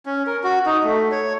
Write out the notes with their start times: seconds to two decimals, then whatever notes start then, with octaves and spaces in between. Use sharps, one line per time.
0.06 C#4
0.26 A#4
0.43 F#4
0.66 D#4
0.84 A3
1.11 C#5